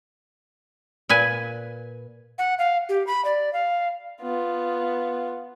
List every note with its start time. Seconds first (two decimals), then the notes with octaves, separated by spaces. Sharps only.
1.09 A#2 B4 G#5
2.38 F#5
2.59 F5
2.89 G4
3.07 B5
3.25 D5
3.53 F5
4.21 B3 F4